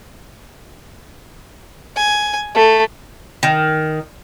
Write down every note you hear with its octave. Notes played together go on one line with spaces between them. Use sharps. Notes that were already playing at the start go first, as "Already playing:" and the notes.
G#5
A3
D#3